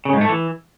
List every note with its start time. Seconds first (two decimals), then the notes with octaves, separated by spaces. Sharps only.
0.05 C#3
0.13 G#2
0.21 A3
0.29 E3